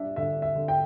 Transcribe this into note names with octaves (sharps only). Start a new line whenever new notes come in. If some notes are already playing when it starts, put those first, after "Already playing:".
Already playing: G3 D4 E5
D3 E5
E5
D3
G5